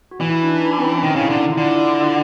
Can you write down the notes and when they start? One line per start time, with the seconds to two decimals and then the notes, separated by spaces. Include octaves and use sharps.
0.11 F#4
0.21 E3
0.30 E4
0.43 D4
0.48 D#4
0.59 D#4
0.66 D4
0.78 C4
0.84 C#4
0.98 C4
1.03 D#3 C#4
1.16 C#3 E4
1.21 D#4
1.30 D3
1.39 E4
1.52 F4
1.57 D3 E4
1.76 E4
1.94 F4